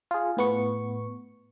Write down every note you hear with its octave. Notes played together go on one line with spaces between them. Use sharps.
F4 G#4
A2 B3 C#6